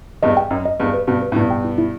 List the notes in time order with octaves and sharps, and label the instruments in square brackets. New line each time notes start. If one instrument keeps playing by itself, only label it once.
[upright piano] E2 G2 [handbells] D#5
[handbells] G5
[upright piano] F#2 [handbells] D#5
[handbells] D#5
[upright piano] E2 G2 [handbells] D#5
[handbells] B4
[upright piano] G2 B2 [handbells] F#4
[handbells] B4
[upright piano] A2
[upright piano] G2 B2 [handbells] E4
[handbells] G5
E4
E4